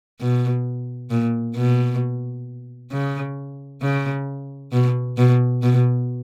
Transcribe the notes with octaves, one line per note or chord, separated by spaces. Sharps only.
B2
A#2
B2
C#3
C#3
B2
B2
B2